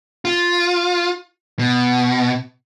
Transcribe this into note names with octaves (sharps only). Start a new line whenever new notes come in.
F4
B2